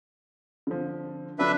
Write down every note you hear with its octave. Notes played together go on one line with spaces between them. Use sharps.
D3 F3
D3 F#3 D4 B4 E5